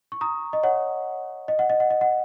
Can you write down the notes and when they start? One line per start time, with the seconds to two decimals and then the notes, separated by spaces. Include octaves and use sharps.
0.12 C#6
0.21 A#5 D#6
0.53 D#5
0.63 C#5 F#5
1.48 D#5
1.59 F#5
1.70 D#5
1.80 F#5
1.90 D#5
2.01 F#5